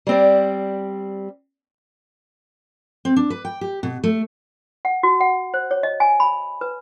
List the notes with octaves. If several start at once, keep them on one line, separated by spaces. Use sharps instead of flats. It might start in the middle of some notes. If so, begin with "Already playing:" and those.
G3 C4 D5
C4
D4
B4
G5
G4
B2
A3
F#5
F#4
F#5
C5
C#5
D#5
G#5
B5
B4